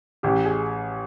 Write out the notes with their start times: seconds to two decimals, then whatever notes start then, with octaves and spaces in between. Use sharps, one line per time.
0.23 A1 G4
0.45 G#4